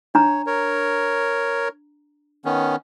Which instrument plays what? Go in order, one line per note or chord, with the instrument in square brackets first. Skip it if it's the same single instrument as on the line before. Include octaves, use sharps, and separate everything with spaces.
[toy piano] D4 A#5 [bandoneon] C#5
[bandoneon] A#4 C#5
D#3 B3 C#4